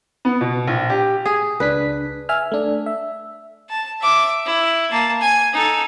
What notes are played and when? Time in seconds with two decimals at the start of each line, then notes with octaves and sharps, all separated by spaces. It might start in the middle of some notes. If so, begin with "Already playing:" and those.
0.25 B3
0.41 B2
0.67 A#1
0.90 G4
1.26 G#4
1.60 C#2 D4 B4 B6
2.29 E5 G#5 F6
2.52 A3 D4
2.86 E5
3.69 A5
4.01 E5 D6
4.46 E4
4.91 A#3 A5
5.21 G#5
5.53 D#4 A4